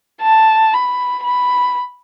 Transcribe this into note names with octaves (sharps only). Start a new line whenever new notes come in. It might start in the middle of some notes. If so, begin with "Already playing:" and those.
A5
B5
B5